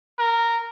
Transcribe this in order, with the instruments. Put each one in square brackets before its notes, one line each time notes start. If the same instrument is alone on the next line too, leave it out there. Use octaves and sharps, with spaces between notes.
[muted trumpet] A#4